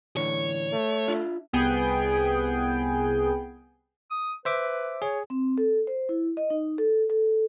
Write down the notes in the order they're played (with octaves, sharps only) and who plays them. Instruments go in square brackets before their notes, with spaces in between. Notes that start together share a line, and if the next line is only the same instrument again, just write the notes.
[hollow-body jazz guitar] A2 D3 E3 [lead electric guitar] C#5
[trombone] A3
[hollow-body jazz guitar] D4 F4 E5
[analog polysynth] C2 B3 G#4 G5
[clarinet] D#6
[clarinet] B4 [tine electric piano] C5 E5 D6
[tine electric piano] G#4 [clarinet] C#5
[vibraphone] C4
A4
C5
E4
D#5
D#4
A4
A4